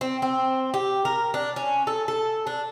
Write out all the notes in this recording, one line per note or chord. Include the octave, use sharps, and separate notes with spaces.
C4
C4
G4
A#4
D4
C#4
A4
A4
D4